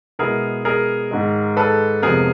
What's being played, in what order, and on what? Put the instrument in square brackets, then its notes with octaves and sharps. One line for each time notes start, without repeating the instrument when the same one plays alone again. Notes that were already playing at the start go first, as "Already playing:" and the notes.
[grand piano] B2 G#3 B3 E4 G#4 A#4
G#4 A#4
G#2 D#3 G#3
A4 B4
F2 C3 F3 G#3 B3 G#4 A#4